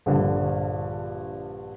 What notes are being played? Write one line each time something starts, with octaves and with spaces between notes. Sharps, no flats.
A#1 G2 D3